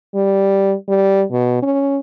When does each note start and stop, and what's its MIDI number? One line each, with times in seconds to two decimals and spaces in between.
0.15 0.74 55
0.89 1.24 55
1.31 1.59 47
1.62 2.00 61